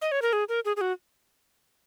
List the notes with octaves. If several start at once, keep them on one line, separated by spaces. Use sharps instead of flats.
D#5
C#5
A#4
G#4
A#4
G#4
G#4
F#4